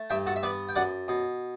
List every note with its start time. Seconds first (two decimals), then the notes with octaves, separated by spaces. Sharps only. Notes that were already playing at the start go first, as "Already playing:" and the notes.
Already playing: A3
0.10 G2 E5 G5
0.26 F#4 A4
0.36 E5
0.43 B3 B4 D5
0.69 G5
0.76 F#2 D5 F#5
1.08 B2